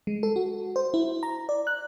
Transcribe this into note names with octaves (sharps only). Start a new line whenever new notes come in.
G#3
A4
F#4
C5
E4
A#5
D5
F#6